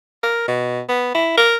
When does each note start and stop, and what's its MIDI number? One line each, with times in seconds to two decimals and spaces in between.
0.23 0.44 70
0.48 0.81 47
0.89 1.12 59
1.14 1.36 64
1.37 1.57 70